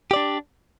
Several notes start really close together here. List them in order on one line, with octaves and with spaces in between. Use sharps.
G4 D5 D4